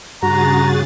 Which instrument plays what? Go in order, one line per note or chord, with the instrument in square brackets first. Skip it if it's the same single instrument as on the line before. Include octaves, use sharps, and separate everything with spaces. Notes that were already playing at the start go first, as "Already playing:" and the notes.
[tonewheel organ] G2 F#4 [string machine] C#3 G#4 A6 [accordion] A#5